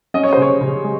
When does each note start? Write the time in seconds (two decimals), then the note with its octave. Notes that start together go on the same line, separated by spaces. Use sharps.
0.14 C#4 D#5
0.23 C#5
0.33 C5
0.37 C#3 C#5
0.61 C#3
0.84 G#3